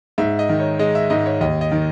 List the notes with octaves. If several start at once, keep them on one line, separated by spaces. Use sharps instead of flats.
G#2 E5
D#5
D#3
C#5
G#3 D#5
E5
G#2 D#5
C#5
D#2 D#5
D#5
D#3